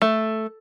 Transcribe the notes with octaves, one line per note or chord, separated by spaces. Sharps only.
A3